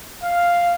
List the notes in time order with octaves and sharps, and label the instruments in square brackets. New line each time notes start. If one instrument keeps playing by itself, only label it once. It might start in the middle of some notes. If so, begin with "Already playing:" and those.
[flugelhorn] F5